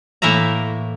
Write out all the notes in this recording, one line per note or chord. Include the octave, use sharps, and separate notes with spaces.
A2 E3 A#3 E5 A#5